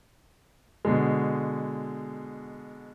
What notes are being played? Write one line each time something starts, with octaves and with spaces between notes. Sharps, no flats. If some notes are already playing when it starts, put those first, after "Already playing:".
B2 D3 G#3